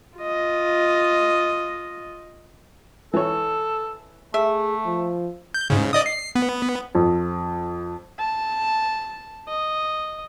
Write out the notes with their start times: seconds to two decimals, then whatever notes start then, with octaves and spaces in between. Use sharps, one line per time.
0.18 F4 D#5
3.14 E3 A4 C#5
4.34 A3 G#4 E5
4.85 F3
5.54 G6
5.70 G#2 C#3
5.93 D5 D#5 D#6
6.06 C7
6.35 B3
6.95 F2
8.19 A5
9.48 D#5